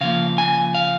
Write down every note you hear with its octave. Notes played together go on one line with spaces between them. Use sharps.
C#3 F3 A#3 F5
G#5
F5